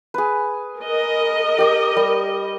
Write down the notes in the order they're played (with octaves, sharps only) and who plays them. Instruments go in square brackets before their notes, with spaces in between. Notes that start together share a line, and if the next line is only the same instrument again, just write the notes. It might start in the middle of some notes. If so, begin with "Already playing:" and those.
[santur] G#4 B4
[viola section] A#4 D#5
[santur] G4 G5 D6
G3